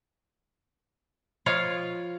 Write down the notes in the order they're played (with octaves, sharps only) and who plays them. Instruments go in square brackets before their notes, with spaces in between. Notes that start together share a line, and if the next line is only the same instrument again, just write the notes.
[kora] F3 F4 C#5 F5